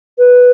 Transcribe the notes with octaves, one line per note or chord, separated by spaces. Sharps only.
B4